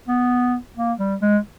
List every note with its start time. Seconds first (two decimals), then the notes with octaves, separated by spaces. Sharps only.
0.08 B3
0.77 A#3
0.99 G3
1.22 G#3